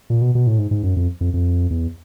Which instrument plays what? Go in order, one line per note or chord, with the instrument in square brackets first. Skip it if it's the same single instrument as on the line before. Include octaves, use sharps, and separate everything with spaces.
[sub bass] A#2
B2
B2
A2
G#2
G#2
F#2
F2
F2
F2
E2